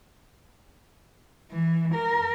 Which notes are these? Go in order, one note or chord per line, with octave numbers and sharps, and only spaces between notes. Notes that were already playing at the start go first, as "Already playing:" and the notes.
E3
A#4